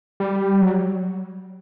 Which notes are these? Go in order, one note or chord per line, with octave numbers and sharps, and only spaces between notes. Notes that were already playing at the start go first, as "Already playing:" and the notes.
G3
F#3